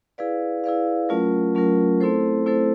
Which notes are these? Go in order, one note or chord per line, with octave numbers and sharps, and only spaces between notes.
E4 G#4 B4 D5 F5
E4 G#4 B4 D5 F5
F#3 A3 C#4 F4 A#4
F#3 A3 C#4 F4 A#4
A3 C4 E4 A4 C5
A3 C4 E4 A4 C5